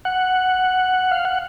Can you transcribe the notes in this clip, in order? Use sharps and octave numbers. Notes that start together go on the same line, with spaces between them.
F#5
F5
F#5